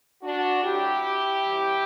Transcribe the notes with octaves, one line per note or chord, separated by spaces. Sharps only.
D4 F#4
D2 D3 F#3 E4 G4
F#2 E3 G3